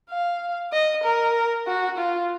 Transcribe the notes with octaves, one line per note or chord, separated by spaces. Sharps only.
F5
D#5
A#4
F#4
F4